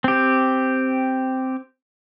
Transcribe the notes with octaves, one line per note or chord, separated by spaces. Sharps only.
C4 G4